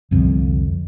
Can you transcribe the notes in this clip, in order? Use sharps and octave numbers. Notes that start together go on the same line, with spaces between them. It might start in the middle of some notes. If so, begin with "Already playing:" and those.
C2 F2 D3 F3